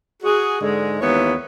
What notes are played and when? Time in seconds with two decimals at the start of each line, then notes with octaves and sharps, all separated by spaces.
0.23 F#4 G#4
0.61 G#2 D3 G#3
1.01 D#2 E3 B3 C#5